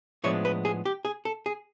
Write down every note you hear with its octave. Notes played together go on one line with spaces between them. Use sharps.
A2 F3 G#3 B3 D4 C#5
B4
G#4
G4
G#4
A4
G#4